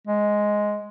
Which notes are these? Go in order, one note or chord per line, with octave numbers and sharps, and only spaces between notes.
G#3